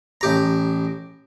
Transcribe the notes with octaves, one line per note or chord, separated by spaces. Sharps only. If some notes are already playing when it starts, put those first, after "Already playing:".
A1 G4 A#5